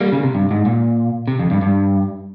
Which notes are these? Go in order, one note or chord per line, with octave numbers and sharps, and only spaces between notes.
G3 A#3
C#3
C3
G2
G#2
A#2
C3
F2
G2
G2